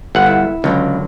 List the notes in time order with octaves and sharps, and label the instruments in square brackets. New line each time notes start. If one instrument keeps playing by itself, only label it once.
[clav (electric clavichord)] G1 F#5
[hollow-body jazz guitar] E4
[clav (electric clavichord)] C#2 [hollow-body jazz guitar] D3 F#3